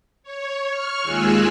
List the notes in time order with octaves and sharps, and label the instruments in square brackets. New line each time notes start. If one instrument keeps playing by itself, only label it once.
[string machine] C#5
C#6 F6
D#2 G#3 F4 G#5 E6 F#6